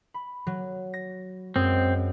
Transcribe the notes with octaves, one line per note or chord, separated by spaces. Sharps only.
B5
F#3
A#6
F#2 G#3 C4 D#6